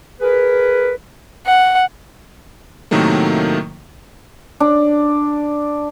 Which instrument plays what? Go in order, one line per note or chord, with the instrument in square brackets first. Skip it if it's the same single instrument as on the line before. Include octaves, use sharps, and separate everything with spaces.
[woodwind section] G#4 A#4 B4
[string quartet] F#5
[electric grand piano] A2 C3 D#3 F#3 A3 A#3
[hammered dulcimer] D4